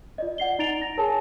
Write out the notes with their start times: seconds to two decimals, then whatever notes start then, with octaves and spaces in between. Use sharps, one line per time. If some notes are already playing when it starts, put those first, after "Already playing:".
0.18 F4 D5 D#5
0.38 D5 F#5 C7 G7
0.59 D#4 A#5 A6 D7 F7
0.82 A#6
0.97 G#4 A#4 C#5 G#5 A5